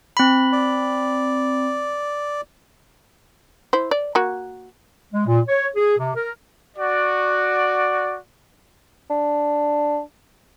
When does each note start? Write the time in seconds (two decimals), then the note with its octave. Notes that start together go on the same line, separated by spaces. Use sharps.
0.17 C4 B5
0.52 D5
3.73 E4 C5
3.91 D5
4.15 A#3 F#4
5.13 G#3
5.27 A#2
5.48 C#5
5.75 G#4
5.98 C3
6.15 A#4
6.77 F#4 D5
9.10 D4